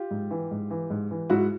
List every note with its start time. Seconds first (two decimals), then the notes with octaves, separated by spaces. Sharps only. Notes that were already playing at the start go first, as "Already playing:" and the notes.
Already playing: F4 G4
0.11 G#2
0.30 E3
0.51 G#2
0.70 E3
0.90 G#2
1.11 E3
1.29 G#2 E4 F#4